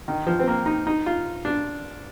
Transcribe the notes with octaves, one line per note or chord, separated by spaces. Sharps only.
D#3
F3
C4
A#3
D#4
D#4
F4
D4